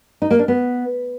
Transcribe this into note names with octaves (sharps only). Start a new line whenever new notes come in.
D#4
A#3
D4
B3